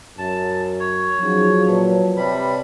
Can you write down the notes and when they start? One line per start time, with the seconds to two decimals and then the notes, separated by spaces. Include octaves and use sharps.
0.18 F#2 A5
0.80 C#5
1.21 F3 F#3 C#4 D#4 G#4
1.67 A#2 B4 C#5 A5
2.17 C3 G3 B5